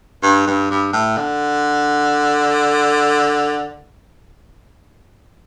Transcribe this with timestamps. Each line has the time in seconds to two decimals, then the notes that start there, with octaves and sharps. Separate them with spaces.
0.23 G2
0.47 G2
0.71 G2
0.93 A2
1.18 D3